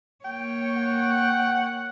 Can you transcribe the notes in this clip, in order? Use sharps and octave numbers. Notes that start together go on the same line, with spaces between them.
A#3 C#5 G5
F#5